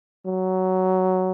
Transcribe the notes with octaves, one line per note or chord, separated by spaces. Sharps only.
F#3